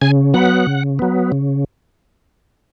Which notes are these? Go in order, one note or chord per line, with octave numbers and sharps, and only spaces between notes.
C#3 G#5
F#3 B3 F#5
C#3
F#3 B3
C#3